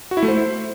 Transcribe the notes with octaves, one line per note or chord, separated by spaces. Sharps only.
F#4
E4
A3
C5